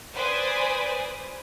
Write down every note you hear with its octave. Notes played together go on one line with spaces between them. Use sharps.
B4 C5 D5 G#5 D#6